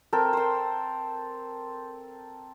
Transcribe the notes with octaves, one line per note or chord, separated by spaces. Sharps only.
C4 A4 A#4 G5
C5 C6